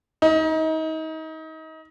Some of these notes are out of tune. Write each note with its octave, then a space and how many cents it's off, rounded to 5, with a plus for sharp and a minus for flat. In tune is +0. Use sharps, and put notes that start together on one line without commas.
D#4 +30